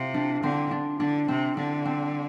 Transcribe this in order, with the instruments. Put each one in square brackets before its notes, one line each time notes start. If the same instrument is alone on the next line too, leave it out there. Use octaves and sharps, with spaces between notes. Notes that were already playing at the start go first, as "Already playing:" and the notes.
Already playing: [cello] C3 [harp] F4
[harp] D4
[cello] D3 [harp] C4
[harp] D4
[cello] D3 [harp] D4
[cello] C3 [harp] C4
[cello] D3 [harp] D4
[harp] C4